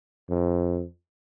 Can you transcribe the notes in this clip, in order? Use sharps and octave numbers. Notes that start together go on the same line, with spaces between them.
F2